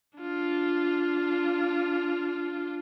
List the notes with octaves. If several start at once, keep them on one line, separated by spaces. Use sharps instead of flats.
D4 F4